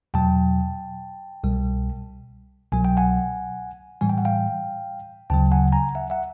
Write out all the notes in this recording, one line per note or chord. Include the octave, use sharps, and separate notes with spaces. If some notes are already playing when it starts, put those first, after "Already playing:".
E2 B2 F#3 G5 A5
C2 B2 G3
C2 B2 F#3 G#5
G5
F#5 G#5
A2 E3 G3 G#5
G5
F#5
F5 G5
D2 C#3 F#3 G5 A5
F#5 G#5
G#5 A#5
E5 F#5
E5 F#5